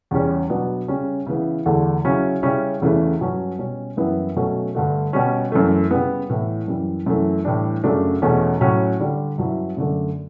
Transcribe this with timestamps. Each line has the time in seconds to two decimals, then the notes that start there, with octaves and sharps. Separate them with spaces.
0.11 E2 C#3 G3 C#4
0.50 B2 F#3 B3 D4
0.88 C#3 G3 C#4
1.27 C#3 E3 B3 E4
1.66 E2 D3 A3
2.05 C#3 F#3 C#4 E4
2.43 C#3 G3 C#4 E4
2.82 E2 C#3 E3 A3 E4
3.21 G2 F#3 C#4
3.59 B2 G3 C#4
3.97 F#2 E3 G3 B3 E4
4.36 B2 F#3 A3 C#4
4.75 G2 D3 A3
5.13 B2 G3 C#4
5.52 F#2 E3 A3
5.91 C#3 G3 B3
6.29 A2 E3 B3 E4
6.68 F#2 E3 G3
7.06 F#2 E3 A3 E4
7.45 A2 E3 G3 D4
7.84 F#2 C#3 F#3 A3 D4
8.22 E2 B2 A3 C#4
8.61 A2 F#3 C#4
9.00 D3 G3 D4
9.38 G2 F#3 C#4 E4
9.77 F#2 D3 A3 D4